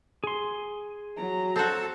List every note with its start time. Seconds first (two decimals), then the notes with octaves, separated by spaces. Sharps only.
0.24 G#4 C6
1.17 F#3 A#5
1.56 C4 F#4 A4 A5